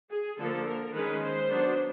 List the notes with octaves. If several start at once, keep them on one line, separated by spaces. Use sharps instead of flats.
G#4
D3 F3 A#3 A4
A#4
D#3 G#3 C#4 B4
C5
F#3 B3 D4